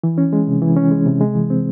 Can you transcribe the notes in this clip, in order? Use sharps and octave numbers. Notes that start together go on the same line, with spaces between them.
E3
C#4
G#3
C3
E3
C#4
G#3
C3
G#3
E3
C4